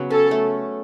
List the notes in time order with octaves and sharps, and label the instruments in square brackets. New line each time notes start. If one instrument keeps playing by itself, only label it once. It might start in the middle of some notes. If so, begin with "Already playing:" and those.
Already playing: [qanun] C#3 F#3 B3
[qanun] C#4 [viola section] A4
[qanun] A3